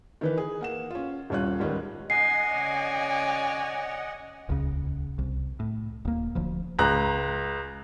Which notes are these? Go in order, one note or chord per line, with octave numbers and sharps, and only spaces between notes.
D#3 E3 B4
G#4
A#3 F#5 E7
C#4 F4
D#1 C2 C#4 F4 C#5 F#6
C#2 G#2 D#3 G3 C#4
D#5 F#5 G#5 C7
C#3 C#5 D5
D#1 C#2 A2 C#3
C2
A2
D#1 A#3
D1 D2 F3
C#2 A#5 F#6